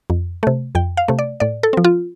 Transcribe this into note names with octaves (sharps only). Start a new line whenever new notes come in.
F2
C3 A3
F2 G5
F5
C3 A3
D5
A2 D5
A4
F3 C4
F4